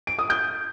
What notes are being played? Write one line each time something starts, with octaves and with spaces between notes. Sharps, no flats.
D7
D#6
G6